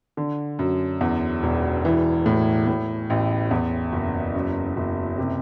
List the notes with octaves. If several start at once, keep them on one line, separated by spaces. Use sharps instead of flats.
D3
F#2
E2
E1
E3
A2
A2
A1
E2
F#1
F#2
F#1
C3